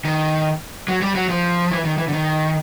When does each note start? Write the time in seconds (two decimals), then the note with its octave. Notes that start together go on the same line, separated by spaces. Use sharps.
0.05 D#3
0.88 F#3
1.02 G3
1.15 F#3
1.29 F3
1.71 E3
1.85 D#3
1.98 E3
2.08 D3
2.13 D#3